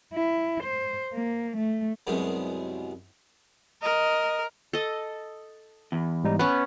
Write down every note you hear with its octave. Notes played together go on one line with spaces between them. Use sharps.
E4
C5
A#3
A3
C2 F#2 B2 G#3
A#4 D#5
A4 D#5
E2
G#2 G3 D#4
B3 C#4 B4